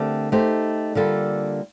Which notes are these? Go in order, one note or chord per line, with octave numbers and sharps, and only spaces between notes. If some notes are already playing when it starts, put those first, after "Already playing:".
Already playing: D3 A3 C4 G4 A#4
A3 D#4 G4 C5
D3 G3 A#3 F4 A4